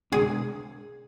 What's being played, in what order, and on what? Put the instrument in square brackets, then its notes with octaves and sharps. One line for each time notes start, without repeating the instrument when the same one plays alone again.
[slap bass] B2 G#3 D4 [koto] G#4